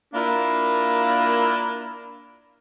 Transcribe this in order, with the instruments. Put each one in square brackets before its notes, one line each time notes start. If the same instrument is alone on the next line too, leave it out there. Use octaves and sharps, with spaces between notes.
[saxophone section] A#3 D4 E4 F4 A#4